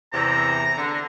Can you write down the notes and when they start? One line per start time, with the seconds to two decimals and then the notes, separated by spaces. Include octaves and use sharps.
0.13 E2 C3 A#5
0.76 D3